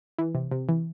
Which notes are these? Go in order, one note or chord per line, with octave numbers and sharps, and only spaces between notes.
E3
C3
C3
E3